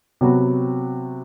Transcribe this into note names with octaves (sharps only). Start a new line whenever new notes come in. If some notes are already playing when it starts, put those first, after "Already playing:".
C3 F#3 B3 F#4